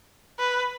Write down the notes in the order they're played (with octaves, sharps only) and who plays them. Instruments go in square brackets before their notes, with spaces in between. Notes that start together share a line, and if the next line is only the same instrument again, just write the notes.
[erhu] B4